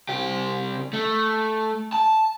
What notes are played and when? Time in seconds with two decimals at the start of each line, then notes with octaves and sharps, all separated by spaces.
0.09 C2 G4
0.93 A3
1.93 A5